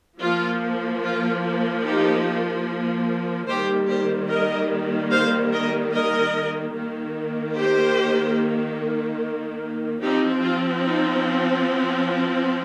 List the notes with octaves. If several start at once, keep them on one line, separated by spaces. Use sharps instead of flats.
F3 A#3 F4
F4
D#4 G4
D#3 G3 A#3 G4 C5
G4 C5
A#4 D#5
C5 F5
A#4 D#5
A#4 D#5
D#3 A#3
G4 C5
F3 C4 D#4 G4
F4
D#4